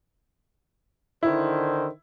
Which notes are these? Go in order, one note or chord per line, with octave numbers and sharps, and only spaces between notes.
D3 D#3 E4 C5